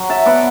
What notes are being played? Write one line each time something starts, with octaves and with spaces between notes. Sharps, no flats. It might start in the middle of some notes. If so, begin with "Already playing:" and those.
Already playing: F#3
E5 A5
B3 D5 F#5